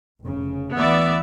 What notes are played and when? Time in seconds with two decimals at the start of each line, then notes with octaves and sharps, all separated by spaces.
0.22 F1 C#3
0.75 D2 E3 B3 D5 E5